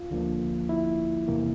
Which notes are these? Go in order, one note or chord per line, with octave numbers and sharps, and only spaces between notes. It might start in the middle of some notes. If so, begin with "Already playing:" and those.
Already playing: F4
D2 D3 F3 A#3
E4
E2 C3 E3 A#3